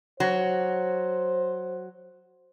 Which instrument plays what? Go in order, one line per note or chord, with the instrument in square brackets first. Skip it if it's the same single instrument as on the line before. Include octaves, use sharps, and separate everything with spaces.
[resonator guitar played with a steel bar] F#3 [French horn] C5